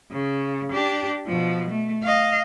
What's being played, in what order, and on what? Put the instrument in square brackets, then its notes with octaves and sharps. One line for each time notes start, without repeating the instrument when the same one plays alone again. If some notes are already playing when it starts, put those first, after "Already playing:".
[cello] C#3
D4 G4
B2 F3
A3
D#5 F5